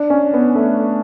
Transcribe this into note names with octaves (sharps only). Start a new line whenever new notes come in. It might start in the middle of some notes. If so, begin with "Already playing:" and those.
Already playing: D4
C#4
B3
A3